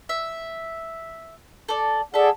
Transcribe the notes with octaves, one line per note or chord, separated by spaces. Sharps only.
E5
A4 D5
G#4 A4 D5 E5 F#5